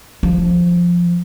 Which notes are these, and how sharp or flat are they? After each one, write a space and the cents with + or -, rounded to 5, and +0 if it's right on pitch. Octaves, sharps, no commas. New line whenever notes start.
F3 +0 D4 +0